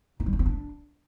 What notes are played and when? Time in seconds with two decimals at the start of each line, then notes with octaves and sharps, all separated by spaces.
0.20 D#4
0.26 G3
0.33 D4
0.39 C4
0.46 D4